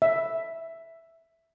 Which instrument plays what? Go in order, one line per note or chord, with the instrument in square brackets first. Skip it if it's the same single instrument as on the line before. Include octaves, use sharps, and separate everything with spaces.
[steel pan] E5